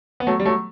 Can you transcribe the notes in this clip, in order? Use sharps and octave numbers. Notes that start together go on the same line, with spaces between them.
B3
F#3 A3
G3
F#3 A3